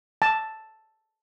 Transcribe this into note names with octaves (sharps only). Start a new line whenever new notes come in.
A5